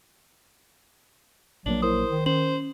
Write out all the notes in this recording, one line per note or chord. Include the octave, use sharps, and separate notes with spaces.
A#1 A#2 F#3 A#3 D4 F#7
E4 A#4 C5 D#6
D#3
C#4 C5 F#7